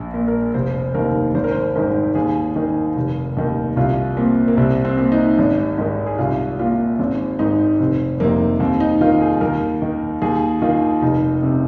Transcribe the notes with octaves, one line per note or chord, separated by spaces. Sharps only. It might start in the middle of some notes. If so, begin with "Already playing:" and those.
Already playing: A#1
A#2
A#4
F1 C5
D#2 D#3 A#4
G#1 C5
A#4
C5
G#2 D#3 A#4
D#2 G#4
D#3
F1
D#2 D#3
C2 F4
A#2 C4
A#3
C2 C4
C4
A#2
D#4
G#1
G#2 D#3
G#4
C2 F4
A#2 F4
G#1 C4
G#2 D#3 D#4
F1 C4
F2 C3 D#3 A#3
D#2 C4
D#4
D#3 F4
G#4
D#2 A#4
D#3
D#2 G#4
D#3 F4
F1 D#4
C3